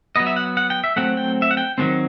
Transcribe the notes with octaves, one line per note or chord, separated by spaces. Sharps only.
F#3 B3 D#5
E5
F#5
F#5
G5
E5
F#3 A3 C4 F#5
G5
E5
F#5
G5
D#3 F#3 A3 C4